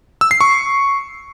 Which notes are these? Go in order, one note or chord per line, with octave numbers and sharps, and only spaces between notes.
E6
C7
C#6